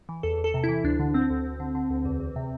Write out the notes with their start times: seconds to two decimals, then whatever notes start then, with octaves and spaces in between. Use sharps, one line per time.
0.09 E3
0.23 E2 A4
0.38 E2
0.44 A4
0.54 C3
0.64 E3 E4
0.84 D2 D4
1.00 D3
1.14 D3 C4
1.30 D2
1.44 D2
1.60 D3
1.75 D3
1.90 D2
2.05 E2
2.20 E2
2.36 C3